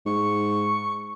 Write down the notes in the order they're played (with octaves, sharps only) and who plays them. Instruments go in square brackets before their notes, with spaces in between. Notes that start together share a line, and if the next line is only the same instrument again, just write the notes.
[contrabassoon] G#2 [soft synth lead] C#6